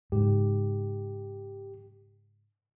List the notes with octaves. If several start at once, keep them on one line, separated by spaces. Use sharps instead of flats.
G#2 C#3 G4